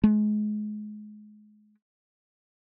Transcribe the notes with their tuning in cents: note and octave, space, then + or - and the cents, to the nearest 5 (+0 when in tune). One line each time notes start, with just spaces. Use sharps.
G#3 +30